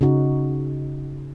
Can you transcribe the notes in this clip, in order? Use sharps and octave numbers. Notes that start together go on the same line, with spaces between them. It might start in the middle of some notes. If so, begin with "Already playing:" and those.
C#3 D#4 F#4